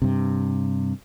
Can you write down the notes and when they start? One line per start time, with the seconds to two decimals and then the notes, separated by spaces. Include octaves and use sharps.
0.02 G2 C3